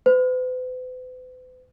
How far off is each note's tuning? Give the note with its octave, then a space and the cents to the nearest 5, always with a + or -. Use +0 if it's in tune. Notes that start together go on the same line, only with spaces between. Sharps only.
B4 +45